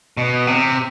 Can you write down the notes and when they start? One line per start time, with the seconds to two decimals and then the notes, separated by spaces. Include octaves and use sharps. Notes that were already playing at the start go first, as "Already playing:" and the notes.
0.17 B2
0.47 C3